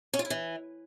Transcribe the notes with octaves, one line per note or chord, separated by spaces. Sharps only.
C#4
F4
E4
E3